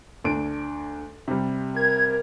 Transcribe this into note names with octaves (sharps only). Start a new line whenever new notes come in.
D2 D4 D7
C3 G3
A#4 G#6